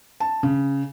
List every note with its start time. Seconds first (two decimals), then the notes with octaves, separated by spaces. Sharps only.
0.20 A5
0.43 C#3